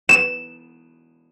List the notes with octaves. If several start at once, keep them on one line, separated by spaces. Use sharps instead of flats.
E7